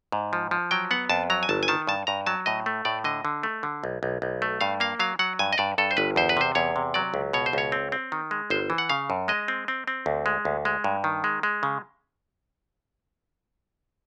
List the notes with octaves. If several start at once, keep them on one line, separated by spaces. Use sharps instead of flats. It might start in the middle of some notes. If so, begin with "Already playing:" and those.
G#2
F3
F3
F#3 G5
B3 F#5
F2 A5
F#3 A#5
G#5
G1 A5
G#5
D#3 A5
G2 A5
G2 A#5
F#3 A5
A2 D#5
A3
A2 D5
D3 D#5
D3
A3
D3
B1
B1
B1
A3
G2 F5
A#3 F5
F#3 F5
F#3 F#5
G2 G#5
D#5
G2 D5
G2 A4
C5
G1 B4
E2 C5
B4
C3 C5
E2 C#5
C3
F#3 D5
C#2
B2 C#5
C5
C#2 C#5
C4
C4
D#3
G#3
G1 C5
E3
F#5
C#3 F5
F#2
G#3 D#5
C4
C4
C4
D2
G#3
D2
G#3
G2
D#3
G#3
G#3
C#3